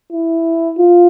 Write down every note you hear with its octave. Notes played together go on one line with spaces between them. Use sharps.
E4
F4